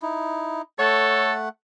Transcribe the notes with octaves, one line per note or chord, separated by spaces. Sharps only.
D#4 E4
A3 A4 C#5 F#5